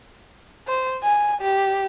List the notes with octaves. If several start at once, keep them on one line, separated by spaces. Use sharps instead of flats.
C5
G#5
G4